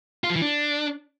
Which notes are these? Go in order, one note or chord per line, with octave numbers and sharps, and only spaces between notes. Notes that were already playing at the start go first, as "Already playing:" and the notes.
F4
F3
E3
D4